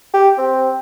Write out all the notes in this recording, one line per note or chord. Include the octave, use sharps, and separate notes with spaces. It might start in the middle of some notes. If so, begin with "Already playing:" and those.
G4
C4